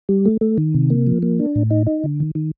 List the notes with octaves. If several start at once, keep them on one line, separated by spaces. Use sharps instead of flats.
G3
A3
A3
D#3
C3
A#3
F3
A#3
D4
A2
D#4
D#4
D3
D#3
D#3